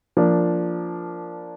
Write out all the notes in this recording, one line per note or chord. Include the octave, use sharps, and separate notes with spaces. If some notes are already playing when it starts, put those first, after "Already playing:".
F3 A#3 D4